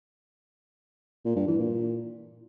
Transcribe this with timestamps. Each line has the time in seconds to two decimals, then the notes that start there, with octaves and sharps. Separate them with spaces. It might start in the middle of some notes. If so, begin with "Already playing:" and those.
1.25 A#2
1.36 G2
1.47 E3
1.59 A#2